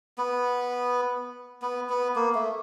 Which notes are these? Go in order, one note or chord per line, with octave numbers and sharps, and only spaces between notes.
B3
B3
B3
A#3
A3